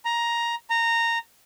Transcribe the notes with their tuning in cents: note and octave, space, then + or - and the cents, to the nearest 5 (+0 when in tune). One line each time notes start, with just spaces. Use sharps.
A#5 +10
A#5 -15